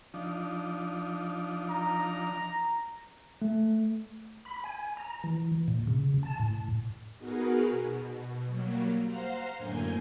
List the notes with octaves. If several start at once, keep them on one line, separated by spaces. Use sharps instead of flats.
F3 D4 D#4
A#5
A3
B5
G#5
A#5
E3
A#2
C#3
A5
A2
B3 D#4 F#4 G#4 A#4 B4
B2
F#3 G3 A#3
C5 F5 F#5 A#5 C6
F#2 A2 D3 A#3 G#5 G6